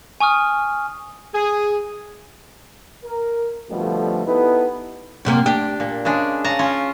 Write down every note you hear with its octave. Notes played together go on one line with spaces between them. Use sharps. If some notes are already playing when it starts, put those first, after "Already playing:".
G#5 C#6 D#6 F6
G#4
A#4
F2 B2 D3 F3 G3 A3
B3 D#4 E4 G4 A4 B4
F#2 C3 A#3
D4 G4
A#2
C#3 G#3 D4
C#3 A5 A#5
C#4 F4